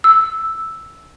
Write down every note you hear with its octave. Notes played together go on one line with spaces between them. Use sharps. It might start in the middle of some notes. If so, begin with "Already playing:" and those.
E6